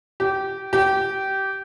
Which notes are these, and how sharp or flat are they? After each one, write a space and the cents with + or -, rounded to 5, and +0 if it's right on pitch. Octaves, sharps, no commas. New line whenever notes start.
G4 -20
G4 -20